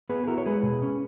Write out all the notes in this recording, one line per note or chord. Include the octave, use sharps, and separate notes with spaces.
B3 G#4 B4
G#4
E4 F#4 A#4
C#5
G#3 G#4 B4
B2
C#4